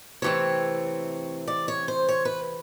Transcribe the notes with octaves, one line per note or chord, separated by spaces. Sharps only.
C3 E3 A3 C4 C#5
D5
C#5
C5
C#5
B4